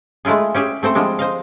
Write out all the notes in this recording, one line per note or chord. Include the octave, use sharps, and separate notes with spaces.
G#3 A3 E4 F4 G#4
C#4 G4 G#4 E5
A3 C4 A4 C5
F3 G3 G#3 D4
C5 D#5 F5